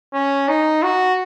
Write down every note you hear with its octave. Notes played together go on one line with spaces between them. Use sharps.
C#4
D#4
F#4